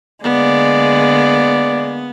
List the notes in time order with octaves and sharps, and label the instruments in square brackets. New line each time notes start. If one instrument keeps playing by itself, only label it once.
[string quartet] D3 G#3 A#3 [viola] B3 [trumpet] D5